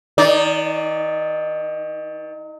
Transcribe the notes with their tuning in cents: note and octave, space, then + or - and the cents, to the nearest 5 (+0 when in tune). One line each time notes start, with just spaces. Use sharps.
D#3 +40 D#4 -25 D5 -30